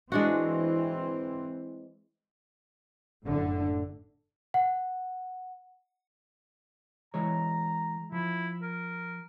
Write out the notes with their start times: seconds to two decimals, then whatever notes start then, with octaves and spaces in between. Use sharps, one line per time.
0.12 E3 G#3 C4 D4 F#4
3.24 F#1 A2 D3
4.54 F#5
7.14 E3 G#3 C#5 A#5
8.12 F3 E4
8.62 A#4